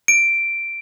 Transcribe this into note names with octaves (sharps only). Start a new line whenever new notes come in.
D7